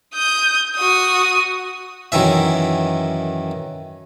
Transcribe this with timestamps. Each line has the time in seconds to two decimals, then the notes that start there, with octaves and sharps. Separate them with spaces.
0.14 D#6 G6
0.75 F#4 D#6
2.12 F#2 D#3 E3 E5